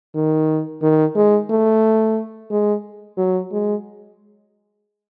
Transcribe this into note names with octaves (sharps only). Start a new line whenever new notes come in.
D#3
D#3
G#3
A3
G#3
F#3
G#3